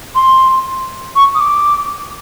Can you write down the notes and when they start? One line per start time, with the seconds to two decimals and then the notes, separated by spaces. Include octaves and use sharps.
0.15 C6
1.16 C#6
1.35 D#6
1.40 D6